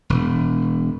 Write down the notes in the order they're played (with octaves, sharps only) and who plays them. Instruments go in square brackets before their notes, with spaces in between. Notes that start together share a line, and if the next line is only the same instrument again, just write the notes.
[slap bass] E1